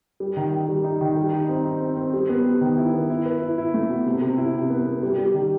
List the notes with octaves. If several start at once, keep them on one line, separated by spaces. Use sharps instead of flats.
G3
D#3
D#3
G3
D#4
D#3
G3
D#4
C4
D#4
C4
C4
G3
B3
G3
D#3
E4
B3
E4
B4
E4
E4
A3
B2
C3
C3
E4
C3
B3
B3
G3
G3
D#3